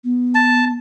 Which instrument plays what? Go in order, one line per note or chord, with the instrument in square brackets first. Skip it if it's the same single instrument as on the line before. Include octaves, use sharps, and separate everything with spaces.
[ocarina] B3
[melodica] A5